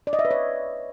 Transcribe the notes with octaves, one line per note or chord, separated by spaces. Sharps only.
D5
D#5
E5
B4
C#5